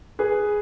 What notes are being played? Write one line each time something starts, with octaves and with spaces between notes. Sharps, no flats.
G#4 B4